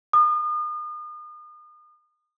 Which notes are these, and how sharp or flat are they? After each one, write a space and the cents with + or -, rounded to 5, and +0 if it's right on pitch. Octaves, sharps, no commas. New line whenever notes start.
D#6 -40